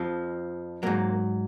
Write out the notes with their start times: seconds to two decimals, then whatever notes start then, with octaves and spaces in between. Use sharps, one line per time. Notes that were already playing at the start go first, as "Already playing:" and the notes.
Already playing: F2 F3
0.83 G#2 F#3 A#3